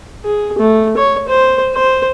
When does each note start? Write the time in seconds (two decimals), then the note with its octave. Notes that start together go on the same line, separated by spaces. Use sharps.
0.25 G#4
0.58 A3
0.97 C#5
1.28 C5
1.74 C5